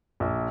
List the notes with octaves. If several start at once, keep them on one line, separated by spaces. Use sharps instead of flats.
A#1